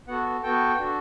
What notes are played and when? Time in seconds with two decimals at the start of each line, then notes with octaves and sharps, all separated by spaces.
0.07 B3 F#4 A4 F#5
0.43 B3 F#4 A4 G5
0.79 D4 F#4 A4